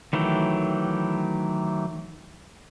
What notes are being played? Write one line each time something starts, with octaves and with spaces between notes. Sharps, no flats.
D#3 E3 F#3 A3 G4